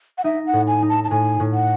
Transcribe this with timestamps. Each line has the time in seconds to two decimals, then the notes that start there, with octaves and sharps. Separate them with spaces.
0.18 F#5
0.24 D#4 E5
0.47 F#5
0.53 A2
0.67 G#5
0.82 D#4
0.89 A5
1.04 A5
1.10 A2 G#5
1.40 A2
1.53 F#5